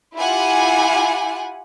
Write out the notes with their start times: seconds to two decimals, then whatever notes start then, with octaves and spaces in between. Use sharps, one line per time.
0.15 E4 F4 G4 F#5 G#5